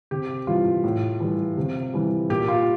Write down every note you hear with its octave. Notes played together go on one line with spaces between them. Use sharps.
C3 G4
E3 G3 F4
A2
E3 G3
C3
E3 G3
A#2 G4
F4